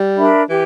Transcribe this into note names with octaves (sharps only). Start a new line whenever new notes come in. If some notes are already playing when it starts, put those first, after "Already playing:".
Already playing: G3
D4 A#4 E5 B5
E3 G4